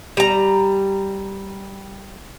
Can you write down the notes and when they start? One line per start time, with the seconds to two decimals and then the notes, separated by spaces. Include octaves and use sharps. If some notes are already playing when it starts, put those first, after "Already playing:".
0.17 G3 A#5